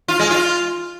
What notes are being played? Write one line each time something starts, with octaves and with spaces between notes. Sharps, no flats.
F4
G#3
F4